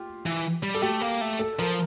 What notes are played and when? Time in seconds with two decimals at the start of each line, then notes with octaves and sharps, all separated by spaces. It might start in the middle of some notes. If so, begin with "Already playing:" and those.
Already playing: F4 G4
0.26 E3
0.63 G3
0.75 A4
0.82 A3 G4
1.01 A#3
1.21 A3
1.39 A4
1.59 F3 A#4